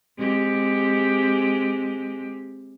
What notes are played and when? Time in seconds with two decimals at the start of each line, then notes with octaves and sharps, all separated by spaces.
0.18 G#3 C4 G4